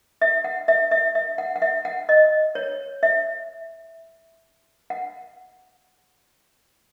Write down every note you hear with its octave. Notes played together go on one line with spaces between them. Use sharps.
E5
F#5
E5
E5
E5
F#5
F#5
E5
F#5
D#5
C#5
E5
F#5